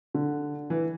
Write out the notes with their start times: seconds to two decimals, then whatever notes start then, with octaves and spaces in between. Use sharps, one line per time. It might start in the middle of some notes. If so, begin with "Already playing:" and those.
0.14 D3
0.70 E3